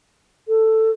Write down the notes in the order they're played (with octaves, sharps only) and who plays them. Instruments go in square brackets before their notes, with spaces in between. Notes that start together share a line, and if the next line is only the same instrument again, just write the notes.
[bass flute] A4